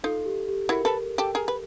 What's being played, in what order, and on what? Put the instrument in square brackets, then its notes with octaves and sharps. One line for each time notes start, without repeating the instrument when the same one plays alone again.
[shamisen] D#4 F4 [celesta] A4
[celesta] G4
G4
[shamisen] E4 F#4 [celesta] A#4
[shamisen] A4 B4
G4 A4
G#4 A#4
B4